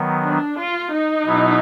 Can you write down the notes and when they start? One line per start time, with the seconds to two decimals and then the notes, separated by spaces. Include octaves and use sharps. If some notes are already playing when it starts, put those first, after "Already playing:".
Already playing: D#3 F#3 B3
0.25 D4
0.58 F4
0.92 D#4
1.25 B2 F#3 B3 E4